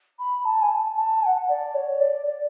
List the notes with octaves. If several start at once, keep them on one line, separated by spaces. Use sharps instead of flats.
B5
A5
G#5
A5
A5
G#5
F#5
D5
C#5
D5
D5